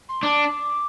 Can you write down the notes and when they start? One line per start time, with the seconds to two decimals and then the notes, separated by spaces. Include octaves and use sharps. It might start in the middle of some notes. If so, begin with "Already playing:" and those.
0.09 C6
0.23 D4 D6